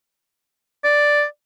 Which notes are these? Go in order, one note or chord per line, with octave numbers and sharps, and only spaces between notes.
D5